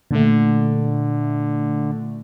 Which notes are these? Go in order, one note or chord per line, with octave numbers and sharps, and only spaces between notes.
A#2 D3 A3